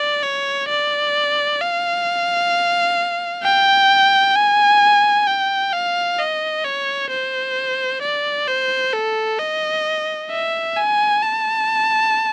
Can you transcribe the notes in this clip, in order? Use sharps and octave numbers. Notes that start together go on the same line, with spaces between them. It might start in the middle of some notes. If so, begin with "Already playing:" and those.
Already playing: D5
C#5
D5
F5
G5
G#5
G5
F5
D#5
C#5
C5
D5
C5
A4
D#5
E5
G#5
A5